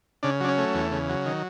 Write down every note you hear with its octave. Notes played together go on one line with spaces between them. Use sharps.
C#3 D4
F#3 D4
C#4
A3
E2
C#3
F#3
D#3